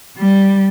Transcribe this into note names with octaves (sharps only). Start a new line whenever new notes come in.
G3